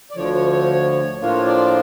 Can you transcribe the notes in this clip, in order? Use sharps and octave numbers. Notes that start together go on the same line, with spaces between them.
D5
D2 D3 F3 C#5
C#5
C#5
A2 F3 A#3 D4 F4 C#5
D5